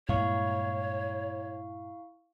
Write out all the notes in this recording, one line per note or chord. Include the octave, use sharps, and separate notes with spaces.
G2 A#2 G#3 E4 C#5 F5 C#6